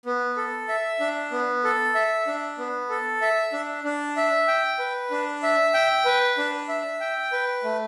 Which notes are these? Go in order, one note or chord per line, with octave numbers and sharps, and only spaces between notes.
B3
A4
E5
D4
B3
A4
E5
D4
B3
A4
E5
D4
D4
E5
G5
B4
D4
E5
G5
B4
D4
E5
G5
B4
A3